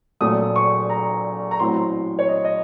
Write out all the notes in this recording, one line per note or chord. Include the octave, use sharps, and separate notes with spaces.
A#1 A#2 F#3 A3 D#6
C#6
A#5
A#5
A1 A2 F#3 C4 C6
C#5
D#5
D#5